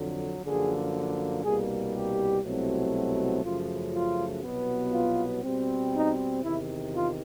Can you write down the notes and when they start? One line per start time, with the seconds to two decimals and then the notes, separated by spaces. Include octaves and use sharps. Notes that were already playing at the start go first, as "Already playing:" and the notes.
Already playing: F2 D3 F#3
0.44 F#2 D3 F3 A#3 G#4
1.43 C2 B2 G3 A#3 G#4
1.93 G4
2.43 C2 B2 F#3 A3 C4
3.43 F#2 C#3 F3 A3 F4
3.93 F4
4.43 C2 B2 F#3 B3
4.92 F4
5.42 B2 G3 C4
5.93 D#4
6.42 E2 C3 D#3 E4
6.93 F4